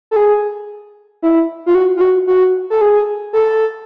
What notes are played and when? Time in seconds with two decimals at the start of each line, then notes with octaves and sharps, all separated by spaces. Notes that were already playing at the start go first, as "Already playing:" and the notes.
0.11 A4
0.16 G#4
1.22 E4
1.66 F4
1.75 F#4
1.97 F4
2.01 F#4
2.27 F#4
2.70 A4
2.81 G#4
3.33 A4